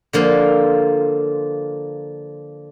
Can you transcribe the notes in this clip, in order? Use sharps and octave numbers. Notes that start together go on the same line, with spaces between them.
D3 F3 A#3 F4